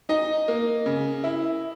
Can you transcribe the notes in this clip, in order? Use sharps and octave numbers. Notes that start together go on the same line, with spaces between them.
D#4 D#5
A#3
C#3
E4